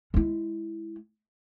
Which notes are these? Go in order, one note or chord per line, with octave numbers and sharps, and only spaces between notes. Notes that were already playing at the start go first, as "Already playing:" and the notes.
G#3 E4